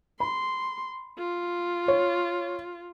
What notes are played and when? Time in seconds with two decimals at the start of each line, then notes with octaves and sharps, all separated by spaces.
0.20 B5 C6
1.18 F4
1.88 C#5